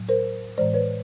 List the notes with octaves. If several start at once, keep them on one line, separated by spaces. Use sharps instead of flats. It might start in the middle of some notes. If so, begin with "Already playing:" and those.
Already playing: A2 F#3
A#4 C5
A2 E3 G#3 C5 D5
B4 C#5